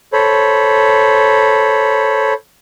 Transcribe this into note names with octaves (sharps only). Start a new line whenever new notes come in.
A4 C5 C#5 B5